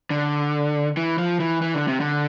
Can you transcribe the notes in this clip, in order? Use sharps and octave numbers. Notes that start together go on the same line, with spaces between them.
D3
E3
F3
E3
E3
D3
C3
D3